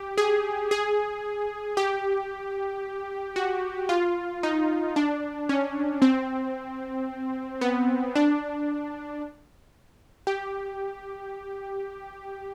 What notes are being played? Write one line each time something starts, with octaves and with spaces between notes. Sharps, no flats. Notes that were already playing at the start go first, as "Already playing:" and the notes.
Already playing: G4
G#4
G#4
G4
F#4
F4
D#4
D4
C#4
C4
B3
D4
G4